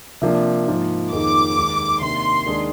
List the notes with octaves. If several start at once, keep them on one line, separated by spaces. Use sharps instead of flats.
C3 F3 A#3 D4
G#2 F3 A#3
F2 D#3 A#3 D#4 G#4 D6
D#2 D#3 G#3 D#4
C3 D#3 A#3 D4 G4 C6
D#2 D#3 G#3 D4 G#4